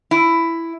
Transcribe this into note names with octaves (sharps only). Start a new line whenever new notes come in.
E4